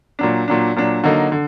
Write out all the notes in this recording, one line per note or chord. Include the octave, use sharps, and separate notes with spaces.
A#2 F#3 D4
A#2 F#3 D4
A#2 F#3 D4
D3 F#3 A#3 D#4
D3